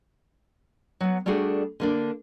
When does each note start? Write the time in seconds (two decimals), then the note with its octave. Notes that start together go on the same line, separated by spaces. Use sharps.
1.00 F#3 B3
1.26 G3 A3 D4 F#4 G#4 A4
1.80 D3 A#3 D4